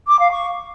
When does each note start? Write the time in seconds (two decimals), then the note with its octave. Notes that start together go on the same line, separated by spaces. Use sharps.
0.08 D6
0.20 F5
0.32 C#6